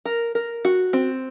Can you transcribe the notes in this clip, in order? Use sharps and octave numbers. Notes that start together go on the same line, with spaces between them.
A#4
A#4
F#4
C4